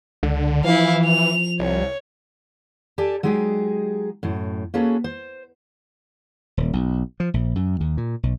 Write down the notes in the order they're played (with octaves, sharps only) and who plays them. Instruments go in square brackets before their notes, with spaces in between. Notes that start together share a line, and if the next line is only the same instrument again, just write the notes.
[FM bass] C#2 [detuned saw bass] D3
[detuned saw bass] E3 [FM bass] F3 [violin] E4 F5
[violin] F7
[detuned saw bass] C2 [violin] C#5
[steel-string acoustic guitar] G4 A4 D5 G#5 A5
F#3 G#3 D#4 G4 G#4
F#2 A2
A#3 C#4 F#4 G#4 A4 B4
C5
[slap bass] D#1
B1
F3
A#1
F#2
D#2
A#2
B1